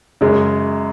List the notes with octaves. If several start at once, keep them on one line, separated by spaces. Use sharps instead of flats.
F#2 C#3 G#3